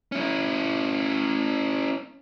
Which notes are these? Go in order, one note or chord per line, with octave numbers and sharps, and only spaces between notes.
C#4 E4